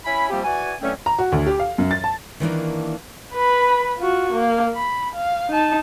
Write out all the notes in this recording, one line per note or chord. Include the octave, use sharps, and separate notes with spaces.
C#4 E4 G#5 B5
C3 F3 G3 A#3 C4 G4
E3 F#4 D5 G#5
D3 E3 F#3 A3 C4 C#4
A#5
F#4
D2
G4
F5
F#2
A6
A5
D#3 E3 A#3 D4
B4 B5
F4 F#4
A#3
B5
F5
D#4 A5